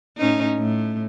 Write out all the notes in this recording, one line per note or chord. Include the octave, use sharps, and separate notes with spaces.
A2 C#4 D#4
A2